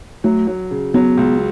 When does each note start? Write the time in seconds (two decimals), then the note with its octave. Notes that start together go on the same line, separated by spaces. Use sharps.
0.24 F#3 A3
0.47 F#3
0.71 C#3
0.94 F#3 B3
1.17 C#2